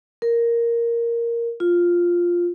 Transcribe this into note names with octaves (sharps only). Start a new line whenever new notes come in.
A#4
F4